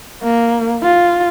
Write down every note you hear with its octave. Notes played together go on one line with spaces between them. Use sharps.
A#3
F4